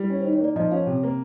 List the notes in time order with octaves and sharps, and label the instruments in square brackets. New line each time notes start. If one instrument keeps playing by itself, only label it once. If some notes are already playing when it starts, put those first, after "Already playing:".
Already playing: [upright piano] G3 [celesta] E4
[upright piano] C#4
[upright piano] D#3 [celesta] C5
[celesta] C#5
[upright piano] A#3 [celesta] D5
[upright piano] F3 [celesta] D#4 D#5
[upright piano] C#4 [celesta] F4 F5
[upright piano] C3
A#3